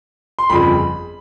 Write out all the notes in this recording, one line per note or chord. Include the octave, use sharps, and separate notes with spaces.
C6
G1 F2 C#3 F3 B5